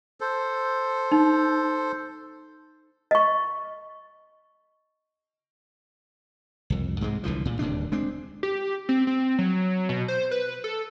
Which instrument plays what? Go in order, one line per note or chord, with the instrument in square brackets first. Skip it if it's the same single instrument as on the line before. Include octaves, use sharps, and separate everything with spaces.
[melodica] A4 C5
[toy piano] D#4
D#5 C#6
[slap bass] C2 F2
G#2 C3 G#3
C2 D3 E3 F3
A#2
D1 D#2 C3 D4
G#3 C4 D4
[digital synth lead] G4
C4
C4
F#3
B2
C5
B4
A4